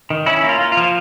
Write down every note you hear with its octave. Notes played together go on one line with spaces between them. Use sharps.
D#3
C#4 E4
A#3
F4
A#3
F4
F3